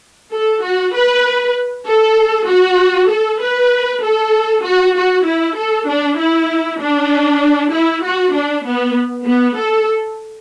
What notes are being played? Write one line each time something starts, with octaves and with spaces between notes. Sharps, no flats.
A4
F#4
B4
A4
F#4
A4
B4
A4
F#4
F#4
E4
A4
D4
E4
D4
E4
F#4
D4
B3
B3
A4